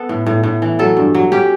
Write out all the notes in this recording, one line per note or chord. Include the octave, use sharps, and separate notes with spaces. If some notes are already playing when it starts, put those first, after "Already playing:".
Already playing: B3 A4
A2
A2
A2
E3
F#3 A4
G2
F#3
C#4 G4